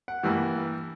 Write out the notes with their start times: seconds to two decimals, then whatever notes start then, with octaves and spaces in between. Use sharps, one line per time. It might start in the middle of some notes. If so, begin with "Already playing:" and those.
0.08 F#5
0.23 G2 E3 G3 A#3